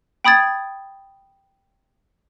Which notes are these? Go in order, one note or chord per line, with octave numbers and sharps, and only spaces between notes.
G5 B5 D#6 G#6 A6